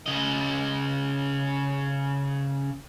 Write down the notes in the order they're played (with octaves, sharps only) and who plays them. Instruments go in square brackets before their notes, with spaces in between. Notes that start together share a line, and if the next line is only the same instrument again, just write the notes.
[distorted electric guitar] C#3 D#5